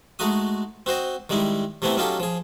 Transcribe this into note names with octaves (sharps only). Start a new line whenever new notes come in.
G#3 A3 D#4 F#4 D#6
C4 F#4 C5 D#5
D#3 G3 G#3 D#4 E4
C3 E3 A3 B3 C4 E4
F#3 C#4 D#4 F4 G4 A4
F3 G#4